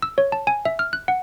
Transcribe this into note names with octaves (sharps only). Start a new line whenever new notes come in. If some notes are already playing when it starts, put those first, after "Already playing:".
E6
C#5
A5
G#5
E5
F6
F#6
F#5